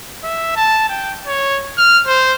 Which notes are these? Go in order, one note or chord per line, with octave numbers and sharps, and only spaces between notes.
E5
A5
G5
C#5
F6
C5